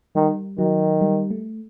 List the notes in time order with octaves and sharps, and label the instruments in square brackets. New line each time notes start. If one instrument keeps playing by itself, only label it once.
[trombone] D#3 [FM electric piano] G3
[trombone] D#3 [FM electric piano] F#3
[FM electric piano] G3
A3